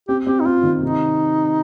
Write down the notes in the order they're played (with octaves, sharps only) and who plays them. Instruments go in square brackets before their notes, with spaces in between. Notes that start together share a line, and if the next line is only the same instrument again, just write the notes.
[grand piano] C4 [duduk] G4
[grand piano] C4 [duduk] G4
[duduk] D#4
[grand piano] C4 [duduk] F4
[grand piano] D#3
[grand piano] C3 [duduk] D#4